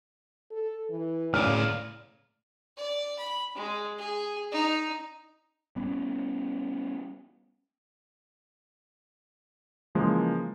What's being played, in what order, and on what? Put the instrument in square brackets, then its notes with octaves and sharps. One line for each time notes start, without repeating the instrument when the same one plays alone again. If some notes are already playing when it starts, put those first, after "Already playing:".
[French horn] A4
E3
[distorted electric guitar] A2 D5 [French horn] C#3 [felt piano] F6
[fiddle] D5
B5
G#3
G#4
D#4
[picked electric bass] G3 B3 C#4
[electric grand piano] C#3 E3 F3 G#3 A#3